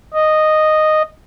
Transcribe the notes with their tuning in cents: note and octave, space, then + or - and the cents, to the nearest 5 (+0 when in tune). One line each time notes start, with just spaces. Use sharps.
D#5 -5